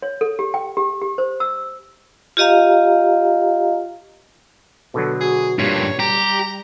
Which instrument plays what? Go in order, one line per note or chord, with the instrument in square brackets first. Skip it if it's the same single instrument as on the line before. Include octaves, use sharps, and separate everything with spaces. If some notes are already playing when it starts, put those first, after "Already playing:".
[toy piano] C#5
A4
G4
G5
G4
G4
C5
E6
[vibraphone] F4 G4 D#5 F5 A#5
[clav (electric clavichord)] B2 D3 F#3 [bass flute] A4
[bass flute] F#4 [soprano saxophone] G#4
[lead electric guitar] G2 A#2 [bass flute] G3 [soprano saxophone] C#5
[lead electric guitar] G4 [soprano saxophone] A#5